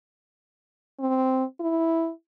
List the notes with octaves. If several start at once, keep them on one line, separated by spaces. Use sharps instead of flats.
C4
E4